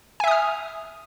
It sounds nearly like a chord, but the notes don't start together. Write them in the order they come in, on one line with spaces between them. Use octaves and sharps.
G#5 E5 D#6 F6